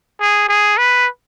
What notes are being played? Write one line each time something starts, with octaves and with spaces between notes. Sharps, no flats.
G#4
G#4
B4